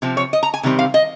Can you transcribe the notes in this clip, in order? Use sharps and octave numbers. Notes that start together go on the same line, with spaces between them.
C3 F3 C4
C#5
D#5
A#5
G#5
C3 D#3 G3 C4
F5
D#5